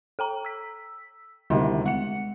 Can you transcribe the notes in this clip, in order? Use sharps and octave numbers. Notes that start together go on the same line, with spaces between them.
A4 G5 A#5
E6 B6
D2 C3 D#3 G3 E4
G#3 F#5 C#7